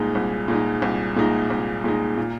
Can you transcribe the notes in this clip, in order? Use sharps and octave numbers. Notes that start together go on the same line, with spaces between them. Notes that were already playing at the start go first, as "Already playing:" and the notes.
Already playing: C2 A#2 G#3 D#4
C2
A#2 G#3 D#4
C2
A#2 G#3 D#4
C2
A#2 G#3 D#4
A#2